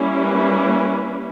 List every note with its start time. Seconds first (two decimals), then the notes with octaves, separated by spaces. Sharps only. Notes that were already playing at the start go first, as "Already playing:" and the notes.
Already playing: G3 A#3 C#4 E4
0.15 B4